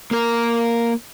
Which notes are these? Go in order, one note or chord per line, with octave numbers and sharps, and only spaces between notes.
A#3 A#4